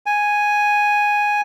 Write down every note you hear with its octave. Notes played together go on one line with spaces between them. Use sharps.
G#5